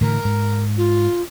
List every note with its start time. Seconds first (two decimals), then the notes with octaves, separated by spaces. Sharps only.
0.01 A2 D3 E3 A#4
0.25 G#2
0.77 F4